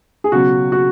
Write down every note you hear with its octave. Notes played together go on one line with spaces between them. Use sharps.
G#4
C#2 B2 F#3 F#4
F#4